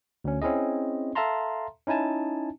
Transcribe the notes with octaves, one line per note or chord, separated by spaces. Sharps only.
D2 C#4
C4 C#4 E4 G#4 D#5
A4 E5 F5 A5 A#5 C6
C#4 D#4 E4 G#5 A5